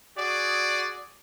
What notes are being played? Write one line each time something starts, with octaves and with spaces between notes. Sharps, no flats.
F#4 G#4 D5